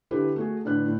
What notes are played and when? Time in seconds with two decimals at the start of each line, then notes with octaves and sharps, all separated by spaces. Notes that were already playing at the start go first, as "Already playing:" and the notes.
0.11 D3 E4 G4 A4 B4
0.36 A3 F#4 G#4
0.65 A2 D3 D4 B4 F#6
0.86 A2